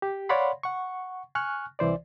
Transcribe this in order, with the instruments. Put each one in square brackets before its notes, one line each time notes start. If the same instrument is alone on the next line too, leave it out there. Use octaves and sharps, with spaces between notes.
[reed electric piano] G4
C#5 D5 F5 F#5 B5 C6
F#5 C#6
G#5 C#6 F6 F#6
C2 E3 C5 D5